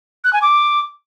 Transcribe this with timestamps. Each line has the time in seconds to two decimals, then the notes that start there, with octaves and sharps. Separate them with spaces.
0.24 F#6
0.33 G#5
0.42 D6